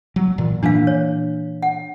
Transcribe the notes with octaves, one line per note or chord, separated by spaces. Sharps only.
F#3
A#2 E3
A#2 E3 A#3 D4 F5
C#5
F#5